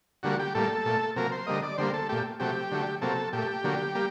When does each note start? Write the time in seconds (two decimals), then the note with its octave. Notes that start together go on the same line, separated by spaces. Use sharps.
0.23 D3 G3 A#3 F#4
0.39 G4
0.55 A2 G3 A#3 A4
0.85 A#2 A3
1.16 C3 F#3 A#3 A#4
1.32 C5
1.47 D3 G3 A#3 D#5
1.63 D5
1.78 D3 G3 A#3 C5
1.93 A4
2.09 A#2 A3 G4
2.40 C3 F#3 A3 G4
2.72 D3 F#3 A3
3.01 C3 F#3 A#3 A4
3.33 A#2 A3 G4
3.64 D3 F#3 A#3
3.95 G3 A#3